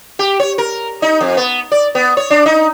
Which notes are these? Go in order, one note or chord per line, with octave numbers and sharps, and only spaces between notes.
G4
C#5
A#4
D#4
F2
B3
D5
B3
C#5
D4
D#4